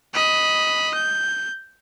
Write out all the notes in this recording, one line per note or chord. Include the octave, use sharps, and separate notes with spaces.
D#5 B5
G6